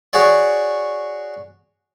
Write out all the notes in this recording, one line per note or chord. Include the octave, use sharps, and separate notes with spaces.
F#4 G#4 C#5 D5